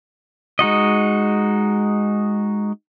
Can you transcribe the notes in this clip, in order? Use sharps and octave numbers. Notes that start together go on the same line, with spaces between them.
G#3 D#4 F#4 D#5